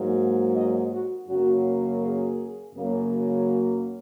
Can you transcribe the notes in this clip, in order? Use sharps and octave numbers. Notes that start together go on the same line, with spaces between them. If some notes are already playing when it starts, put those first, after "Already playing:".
Already playing: G#2 F#3 A#3
D#5
F#4
F#2 C#3 F#3 A#3 F#4
G#4
F#2 C#3 F#3 A#3